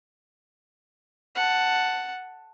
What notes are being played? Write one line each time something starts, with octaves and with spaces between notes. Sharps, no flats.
F#5 A5